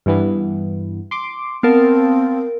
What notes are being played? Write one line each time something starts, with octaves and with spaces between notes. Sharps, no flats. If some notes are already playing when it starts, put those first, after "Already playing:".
G2 E3 B3
C6 D6
B3 C4 A#4 F5 A5